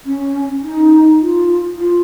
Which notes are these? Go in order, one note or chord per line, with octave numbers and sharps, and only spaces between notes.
C#4
D#4
F4
F4